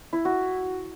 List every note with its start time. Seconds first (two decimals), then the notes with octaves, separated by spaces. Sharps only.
0.13 E4
0.25 F#4